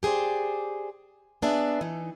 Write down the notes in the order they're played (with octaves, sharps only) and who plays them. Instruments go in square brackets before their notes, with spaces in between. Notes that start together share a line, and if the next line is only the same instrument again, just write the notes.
[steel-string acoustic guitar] G4 G#4 B4 C5 D5
B3 D4 G#4 B4 E5
E3 D#4